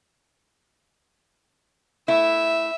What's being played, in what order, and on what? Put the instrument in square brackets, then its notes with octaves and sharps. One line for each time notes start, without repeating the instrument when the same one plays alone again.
[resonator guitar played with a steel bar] A3 E4 [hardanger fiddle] E5